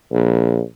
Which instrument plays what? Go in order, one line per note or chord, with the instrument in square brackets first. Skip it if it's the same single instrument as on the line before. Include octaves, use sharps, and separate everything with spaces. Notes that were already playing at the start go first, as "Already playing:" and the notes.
[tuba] A#1